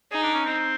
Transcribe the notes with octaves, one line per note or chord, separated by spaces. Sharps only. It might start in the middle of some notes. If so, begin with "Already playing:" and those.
D#4 G#4
D4
C#4
C4